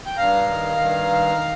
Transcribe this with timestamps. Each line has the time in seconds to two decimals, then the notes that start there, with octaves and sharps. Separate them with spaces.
0.06 G5
0.17 G2 F5 A#5
0.47 D#3
0.77 G2
1.07 D#3